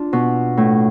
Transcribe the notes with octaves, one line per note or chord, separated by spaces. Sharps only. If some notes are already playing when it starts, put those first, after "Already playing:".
Already playing: D4 F4
B2
A2